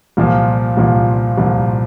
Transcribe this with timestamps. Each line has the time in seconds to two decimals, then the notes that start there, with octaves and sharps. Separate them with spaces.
0.17 C2 A#2 F3
0.77 C2 A#2 F3
1.38 C2 A#2 F3